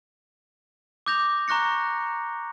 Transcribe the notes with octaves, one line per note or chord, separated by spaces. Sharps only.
D6 D#6 G6 A#6 F7
A#5 C#6 F#6 A#6 C#7